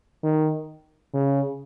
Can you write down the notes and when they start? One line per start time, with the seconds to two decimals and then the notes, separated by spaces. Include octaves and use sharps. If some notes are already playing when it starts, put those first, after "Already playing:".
0.23 D#3
1.14 C#3